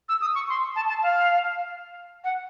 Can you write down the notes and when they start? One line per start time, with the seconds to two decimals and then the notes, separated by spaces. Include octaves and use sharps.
0.09 E6
0.21 D#6
0.35 C#6
0.49 C6
0.76 A5
0.89 A5
1.03 F5
2.24 F#5